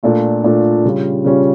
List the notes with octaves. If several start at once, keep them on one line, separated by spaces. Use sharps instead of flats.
A#2 A3 D4 F4
A#2 A3 D4 F4
C#3 G3 C#4 F4
C#3 G3 C#4 F4